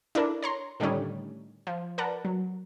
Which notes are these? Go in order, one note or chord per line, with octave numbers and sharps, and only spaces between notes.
D4 E4 A4 A#4
C#5 A#5 C6
A2 D3 D#3 G3 C#4 D#4
F3
A#4 B4 D5 F#5 A5 A#5
F#3